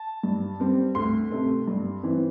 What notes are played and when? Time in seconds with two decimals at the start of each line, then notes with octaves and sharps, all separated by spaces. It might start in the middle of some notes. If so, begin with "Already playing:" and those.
Already playing: A5
0.23 G2
0.60 G3 C4
0.95 D2 C6
1.31 C3 A3
1.68 G2
2.03 E3 C4